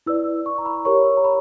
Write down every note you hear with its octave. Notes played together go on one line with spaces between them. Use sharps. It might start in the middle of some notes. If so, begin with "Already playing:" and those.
E4 B4 D5 E6
C#6
A#5
B5
G4 A#4 C#5 C#6
A#5
B5